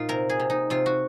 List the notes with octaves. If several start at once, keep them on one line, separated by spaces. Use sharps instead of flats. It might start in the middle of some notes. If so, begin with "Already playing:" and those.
Already playing: A#2 D#4 F4
C3 A#4
G#4
C3
D#4
C3 F4
F#4